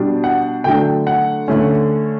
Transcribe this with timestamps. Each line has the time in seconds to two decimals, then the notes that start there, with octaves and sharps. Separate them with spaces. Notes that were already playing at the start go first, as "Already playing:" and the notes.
Already playing: B2 G3 D4
0.24 F#5
0.64 D3 F#3 A3 D4 G5
1.07 F#5
1.48 D3 A3 C#4